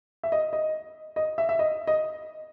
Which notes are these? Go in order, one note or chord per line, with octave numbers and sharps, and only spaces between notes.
E5
D#5
D#5
D#5
E5
E5
D#5
D#5